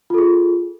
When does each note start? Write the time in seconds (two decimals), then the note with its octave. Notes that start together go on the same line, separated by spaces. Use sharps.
0.10 F4
0.14 A4
0.18 G#4